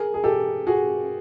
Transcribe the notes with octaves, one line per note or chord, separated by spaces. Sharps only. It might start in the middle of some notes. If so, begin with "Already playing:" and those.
Already playing: G#4 A#4
G#4
G4 A4
F#4 G#4